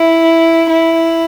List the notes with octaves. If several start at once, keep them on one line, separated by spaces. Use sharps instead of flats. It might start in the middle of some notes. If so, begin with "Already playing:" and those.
Already playing: E4
E4